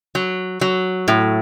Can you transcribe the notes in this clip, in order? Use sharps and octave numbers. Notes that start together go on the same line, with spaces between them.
F#3
F#3
A2